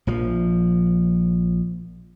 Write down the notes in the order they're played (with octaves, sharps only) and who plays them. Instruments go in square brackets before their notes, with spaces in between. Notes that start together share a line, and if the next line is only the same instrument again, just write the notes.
[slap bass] A#1 F3